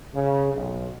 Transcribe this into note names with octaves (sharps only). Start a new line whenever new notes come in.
C#3
B1